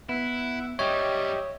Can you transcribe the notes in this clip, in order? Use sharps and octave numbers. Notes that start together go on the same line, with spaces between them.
B3 E4 E5 F#5
F#2 G3 G4 C#5 D#5 E5